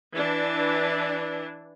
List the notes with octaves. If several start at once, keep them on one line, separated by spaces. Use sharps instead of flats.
E3 D4